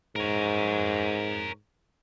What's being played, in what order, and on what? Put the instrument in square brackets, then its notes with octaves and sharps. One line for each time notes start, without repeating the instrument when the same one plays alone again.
[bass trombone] G#2 [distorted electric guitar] A#4 C#5